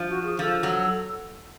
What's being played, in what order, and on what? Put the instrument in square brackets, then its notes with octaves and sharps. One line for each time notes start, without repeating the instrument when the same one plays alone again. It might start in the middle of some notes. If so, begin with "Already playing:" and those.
Already playing: [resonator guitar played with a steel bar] F3
[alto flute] F#4
G#4
[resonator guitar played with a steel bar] F3 [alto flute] A4
[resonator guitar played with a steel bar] F#3